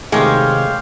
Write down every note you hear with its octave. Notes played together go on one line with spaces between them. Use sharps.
C3 D#3 G#3 A3 G4 C#5 F5 G5